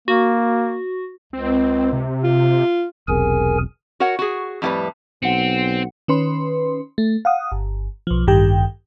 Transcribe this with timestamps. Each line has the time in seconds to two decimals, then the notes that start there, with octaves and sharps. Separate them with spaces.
0.08 A#3 F#4
1.33 C#2 C4
1.93 C3
2.24 F4
3.08 E1 B1 C3 G#4 A#4 G#5
4.00 F#4 A#4 C#5 F#5
4.19 F#4 G#4
4.62 F2 A2 G3 F4 B4
5.23 B1 C4 F#5 C#7
6.08 D#3 C#4 B4 C6
6.98 A3
7.25 F5 F#5 D#6
7.52 G1
8.07 B1 F3
8.27 A1 G2 D#3 G4 G5